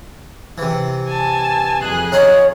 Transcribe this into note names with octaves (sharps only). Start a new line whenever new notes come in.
C3 E3
G#5 A5
F2 G#4 F#6
D#4 F4 C#5 B5